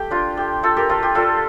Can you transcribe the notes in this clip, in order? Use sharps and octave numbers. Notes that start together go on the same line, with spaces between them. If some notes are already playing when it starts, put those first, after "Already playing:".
Already playing: A3 G4
D4 F4
A3 G4
A3 F4 A4
G4 A#4
A3 F4 A4
G4
G3 F4 A4